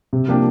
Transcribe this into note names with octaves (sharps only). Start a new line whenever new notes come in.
C3
F3 A#3 D4 G4